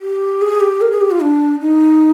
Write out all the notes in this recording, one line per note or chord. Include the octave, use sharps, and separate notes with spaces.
G4
G#4
G4
A#4
G#4
G4
F4
D4
D#4